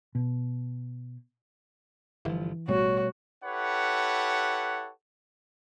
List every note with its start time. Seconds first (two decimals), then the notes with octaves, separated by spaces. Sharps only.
0.15 B2
2.25 G1 E3 F3
2.68 A1 B2 G3 A3 F#4 C#5
3.45 E4 G4 A4 B4 C#5 F#5